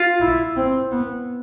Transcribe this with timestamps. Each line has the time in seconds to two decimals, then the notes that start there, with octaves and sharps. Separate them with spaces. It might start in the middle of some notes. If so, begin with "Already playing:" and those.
Already playing: F4
0.21 E4
0.56 C4
0.91 B3